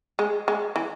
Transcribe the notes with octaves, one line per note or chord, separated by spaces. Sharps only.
G#3
G#3
E3